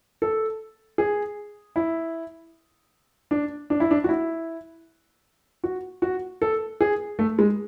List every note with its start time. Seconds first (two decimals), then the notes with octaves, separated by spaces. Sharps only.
0.22 A4
0.98 G#4
1.76 E4
3.31 D4
3.70 D4
3.80 E4
3.91 D4
4.04 F#4
4.09 E4
5.64 F#4
6.02 F#4
6.42 A4
6.81 G#4
7.19 A3
7.39 G#3